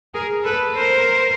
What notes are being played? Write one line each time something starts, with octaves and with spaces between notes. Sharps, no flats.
G#4 A#4
A4 B4
A#4 C5